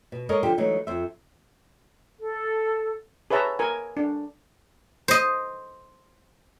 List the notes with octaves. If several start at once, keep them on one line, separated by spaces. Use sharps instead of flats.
B2
G#3 A4 A#4 C#5 D#5
D3 F3 G4 C5
E3 F#3 G#3 A3 D#4
F2 C5 E5
A4
G#4 B4 C#5 E5 A5 A#5
A#4 G#5
D4
C5 D#5